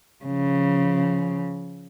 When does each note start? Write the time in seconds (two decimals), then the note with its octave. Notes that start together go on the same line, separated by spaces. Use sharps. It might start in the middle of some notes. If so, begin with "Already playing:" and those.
0.25 C#3 F3